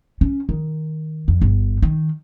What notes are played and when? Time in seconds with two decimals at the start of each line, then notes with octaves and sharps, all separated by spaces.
0.21 C#4
0.49 D#3
1.28 F2
1.41 G1
1.82 D#3